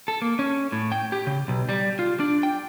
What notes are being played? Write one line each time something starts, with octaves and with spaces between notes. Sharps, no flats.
A4
A#3
C#4
A2
G5
G4
C#3
B1
G3
F4
D4
G5